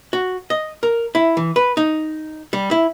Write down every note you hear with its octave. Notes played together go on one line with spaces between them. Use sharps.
F#4
D#5
A#4
E4
E3
B4
D#4
G3
E4